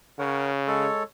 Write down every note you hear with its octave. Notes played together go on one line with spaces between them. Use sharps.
C#3 A#4 C#5 F#5
G#3 A4 C#5